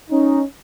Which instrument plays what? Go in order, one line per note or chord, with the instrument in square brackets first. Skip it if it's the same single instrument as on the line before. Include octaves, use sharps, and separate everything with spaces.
[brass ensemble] C#4 D#4